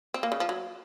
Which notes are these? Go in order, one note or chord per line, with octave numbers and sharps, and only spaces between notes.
C4
A#3
C#3
F3
F#3